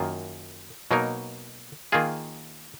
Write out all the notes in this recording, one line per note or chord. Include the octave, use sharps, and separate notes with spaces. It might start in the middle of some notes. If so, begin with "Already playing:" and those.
Already playing: F#2 D#3 A#3 F4
B2 F#3 A#3 D#4 A#4
D#3 A#3 F4 G#4